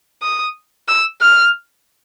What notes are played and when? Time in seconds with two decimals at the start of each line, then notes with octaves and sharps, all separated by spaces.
0.22 D#6
0.88 E6
1.22 F6